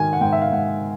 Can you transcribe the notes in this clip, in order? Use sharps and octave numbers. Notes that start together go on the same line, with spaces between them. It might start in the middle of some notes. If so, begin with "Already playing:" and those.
Already playing: G#2 D#3 G#5
F#5
G#2 G5
E5
F5
G#2 F#5